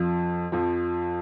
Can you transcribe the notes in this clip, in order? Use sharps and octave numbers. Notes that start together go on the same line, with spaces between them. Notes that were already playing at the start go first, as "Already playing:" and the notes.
Already playing: F2 F3
F2 F3